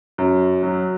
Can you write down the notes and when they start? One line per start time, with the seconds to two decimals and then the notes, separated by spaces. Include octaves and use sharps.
0.18 F#2
0.63 F#3